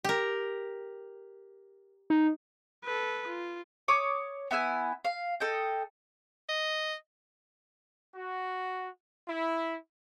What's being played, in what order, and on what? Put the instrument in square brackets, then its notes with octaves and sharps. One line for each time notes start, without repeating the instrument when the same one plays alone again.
[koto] G4 A#4
[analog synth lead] D#4
[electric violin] A4 B4
F4
[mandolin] C#5 D6 D#6
B3 E4 E5 G#5
F5
A4 D#5 G5
[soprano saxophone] D#5
[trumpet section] F#4
E4